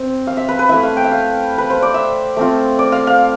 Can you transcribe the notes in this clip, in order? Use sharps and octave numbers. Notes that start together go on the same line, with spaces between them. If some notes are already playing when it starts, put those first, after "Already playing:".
Already playing: C4
F5
E5
B4
B4
A3 E4 E5
F5
G5
E5
F5
B4
C5
D5
E5
A3 C4 F4
D5
F5
F5